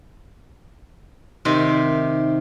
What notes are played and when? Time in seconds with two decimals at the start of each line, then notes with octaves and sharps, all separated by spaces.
1.45 C3 D#3 D#4 E5